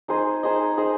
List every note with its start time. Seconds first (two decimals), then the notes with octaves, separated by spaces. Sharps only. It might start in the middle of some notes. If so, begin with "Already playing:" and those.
0.08 D#4 G#4 C5 D#5
0.43 D#4 G#4 C5 D#5
0.78 D#4 G#4 C5 D#5